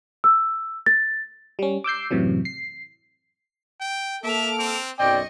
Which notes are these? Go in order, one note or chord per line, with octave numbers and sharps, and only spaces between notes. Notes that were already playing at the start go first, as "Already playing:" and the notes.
E6
A6
G3 C#4
D6 E6 G6 C7
F#2 A2 C3 E3 F#3
C7
G5
A#3 A4 E5 D6 F6
C4
B1 F#2 C4 D5 D#5 G5 C#6